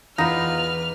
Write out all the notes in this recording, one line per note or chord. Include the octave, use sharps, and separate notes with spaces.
E2 B3 D#4 F4 B4 B5 F6